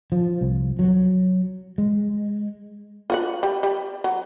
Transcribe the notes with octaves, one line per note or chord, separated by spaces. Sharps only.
F3
C2
F#3
G#3
F4 F#4 F#5
G3
G3
F#3